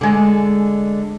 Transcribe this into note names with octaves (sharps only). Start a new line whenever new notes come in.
D3 G#3